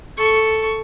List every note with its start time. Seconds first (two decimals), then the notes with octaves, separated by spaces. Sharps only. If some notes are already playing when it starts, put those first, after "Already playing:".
0.17 A4 C#6